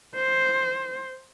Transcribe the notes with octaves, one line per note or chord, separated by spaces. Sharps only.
C5